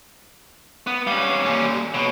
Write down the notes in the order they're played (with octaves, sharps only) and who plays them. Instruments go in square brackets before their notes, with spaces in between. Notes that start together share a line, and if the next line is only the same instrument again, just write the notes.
[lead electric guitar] B3
[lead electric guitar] G3 C#4 [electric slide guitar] F5
[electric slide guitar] A#3 A4 G#5
[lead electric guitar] B2 [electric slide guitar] B4 C#5